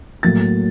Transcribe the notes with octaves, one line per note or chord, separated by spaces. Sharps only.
A2 F#3 A#3 A6